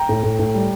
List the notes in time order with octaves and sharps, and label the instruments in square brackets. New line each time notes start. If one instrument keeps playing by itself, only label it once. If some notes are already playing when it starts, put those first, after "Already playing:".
Already playing: [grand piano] G5 A#5
A2
A2
A2
G3